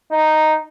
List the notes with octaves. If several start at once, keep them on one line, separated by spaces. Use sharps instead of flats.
D#4